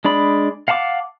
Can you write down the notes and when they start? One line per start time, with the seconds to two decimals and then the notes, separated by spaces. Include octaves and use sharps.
0.05 G#3 D4 D5 B5
0.68 F5 F#5 A5 A#5 D6